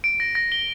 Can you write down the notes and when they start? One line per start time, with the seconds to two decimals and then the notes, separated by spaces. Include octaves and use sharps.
0.04 D7
0.20 A#6
0.35 A#6
0.52 G7